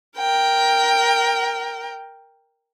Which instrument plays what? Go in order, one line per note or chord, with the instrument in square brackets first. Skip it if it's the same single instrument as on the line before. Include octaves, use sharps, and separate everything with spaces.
[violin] A#4 G5